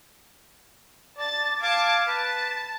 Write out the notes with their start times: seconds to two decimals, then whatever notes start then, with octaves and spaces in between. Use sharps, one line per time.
1.17 D5 A5 A6
1.62 F5 A5 D6 G#6
2.08 B4 A5